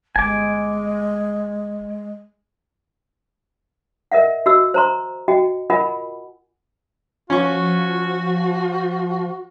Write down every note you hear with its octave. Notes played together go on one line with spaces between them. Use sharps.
G1 G#3 G#5 D6
A#4 D#5 E5 F#5
F#4 D#5 E6
C5 A#5 C6
F#4 D#5 G5
F4 A#4 D#5 F#5 G#5 B5
F3 C#4 F#4 C#6